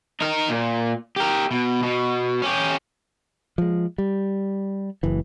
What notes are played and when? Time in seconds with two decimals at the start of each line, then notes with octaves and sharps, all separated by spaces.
0.21 D#4 A#4
0.49 A#2
1.16 G4 A#4
1.51 B2
1.83 B2
2.42 C#4 G4
3.58 F3 G#3
3.98 G3
5.03 F#1 E3